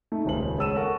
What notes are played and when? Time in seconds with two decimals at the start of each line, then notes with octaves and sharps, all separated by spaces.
0.12 A3 D#4
0.25 D#1 C#2 C#3 C5 F#7
0.58 G#3 C#5 A5 E6 D#7 E7
0.76 A4 A#4 F#5 A5 C#6